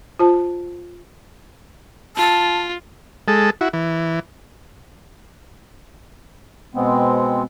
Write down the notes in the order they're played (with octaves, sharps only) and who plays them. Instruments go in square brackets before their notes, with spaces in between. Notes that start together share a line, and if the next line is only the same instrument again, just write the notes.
[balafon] F4 C5 A5
[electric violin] F4 [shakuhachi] A5
[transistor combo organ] G#3 A4
E4 F#4
E3
[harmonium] B2 G#3 B3 C4